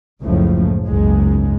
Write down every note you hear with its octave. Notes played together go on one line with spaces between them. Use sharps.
F#1 C#2 A2 F3
F#1 C#2 G#2 G#3